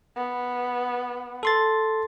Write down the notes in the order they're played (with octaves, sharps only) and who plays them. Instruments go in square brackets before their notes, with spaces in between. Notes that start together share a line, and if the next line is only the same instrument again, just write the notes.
[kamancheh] B3
[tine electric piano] A4 C6 A6